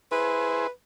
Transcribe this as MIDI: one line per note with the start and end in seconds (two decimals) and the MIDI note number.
0.12 0.67 64
0.12 0.67 68
0.12 0.70 71
0.12 0.67 72